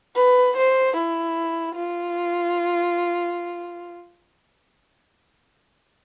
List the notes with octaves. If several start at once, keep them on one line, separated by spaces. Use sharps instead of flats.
B4
C5
E4
F4